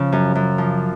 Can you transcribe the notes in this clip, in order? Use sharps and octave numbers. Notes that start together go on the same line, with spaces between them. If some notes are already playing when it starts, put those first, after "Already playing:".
Already playing: C#3 F3
F#2
F#2
F3